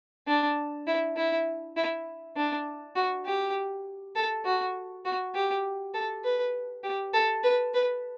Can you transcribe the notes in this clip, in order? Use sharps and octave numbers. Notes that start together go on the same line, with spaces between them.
D4
E4
E4
E4
D4
F#4
G4
A4
F#4
F#4
G4
A4
B4
G4
A4
B4
B4